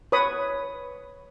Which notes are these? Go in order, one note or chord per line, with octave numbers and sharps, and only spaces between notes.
B4 C#5 B5 D#6